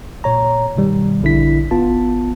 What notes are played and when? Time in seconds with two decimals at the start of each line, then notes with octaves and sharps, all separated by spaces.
0.24 A#2 C#5 A#5
0.76 G2 B2 D#3 G3
1.22 A#1 D3 D4 E4 B6
1.71 G#1 B3 F4 A5